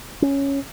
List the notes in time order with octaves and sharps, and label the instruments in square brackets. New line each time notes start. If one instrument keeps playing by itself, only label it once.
[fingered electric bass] C#4